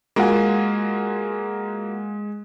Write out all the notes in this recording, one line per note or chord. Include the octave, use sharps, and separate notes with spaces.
G#3 A#3 F4 F#4 G#5